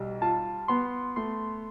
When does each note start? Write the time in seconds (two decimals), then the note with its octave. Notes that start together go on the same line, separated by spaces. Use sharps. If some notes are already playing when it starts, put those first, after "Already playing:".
Already playing: B1 G3
0.22 F4 A5
0.68 B3 C6
1.16 A3 C6